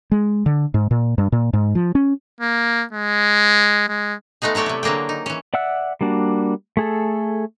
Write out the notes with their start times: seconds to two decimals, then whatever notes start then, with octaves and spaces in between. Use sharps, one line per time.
0.12 G#3
0.46 D3
0.74 G#2
0.91 A#2
1.18 G2
1.32 A#2
1.53 G#2
1.75 F3
1.95 C#4
2.41 A#3
2.93 G#3
3.88 G#3
4.42 G#3 A3 B3 D#4 G#4
4.55 F#3 A3 C#5 D5 G5
4.66 C3 E4
4.83 D3 F#3 A#3 G#4 G5
5.09 D#4
5.26 E3 C#4
5.54 D5 E5 F#5 E6 F#6
6.01 G3 A#3 D4 F#4
6.77 A3 G#4 A4